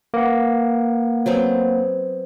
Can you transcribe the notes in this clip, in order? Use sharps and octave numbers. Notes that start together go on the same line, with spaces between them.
A#3 B4 F#5
F#3 B3 C4